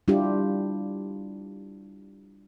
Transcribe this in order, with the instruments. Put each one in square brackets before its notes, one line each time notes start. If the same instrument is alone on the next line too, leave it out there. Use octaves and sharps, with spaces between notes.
[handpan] G3 D4 E4 F4 G4